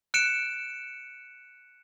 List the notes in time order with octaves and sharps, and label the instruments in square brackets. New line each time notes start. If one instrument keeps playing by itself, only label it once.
[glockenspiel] F#6 C#7 D7 E7